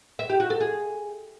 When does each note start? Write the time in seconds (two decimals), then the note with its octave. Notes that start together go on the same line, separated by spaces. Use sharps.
0.19 E5
0.29 G4
0.40 F#4
0.50 A4
0.60 G#4